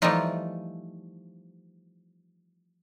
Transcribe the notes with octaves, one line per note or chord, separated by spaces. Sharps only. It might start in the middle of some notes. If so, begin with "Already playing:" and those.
E3 F3 G3 A3 D#4 F4